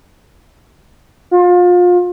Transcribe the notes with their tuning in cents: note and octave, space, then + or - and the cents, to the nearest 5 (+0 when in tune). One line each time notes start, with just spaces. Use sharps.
F4 +30